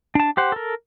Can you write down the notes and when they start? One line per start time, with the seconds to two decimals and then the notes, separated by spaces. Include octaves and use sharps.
0.15 D4 A5
0.37 G4 C5 F#5
0.52 A4 A#4